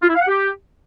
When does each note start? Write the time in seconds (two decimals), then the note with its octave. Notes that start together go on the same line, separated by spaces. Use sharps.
0.03 F4
0.09 E4
0.15 F5
0.22 F#5
0.28 G4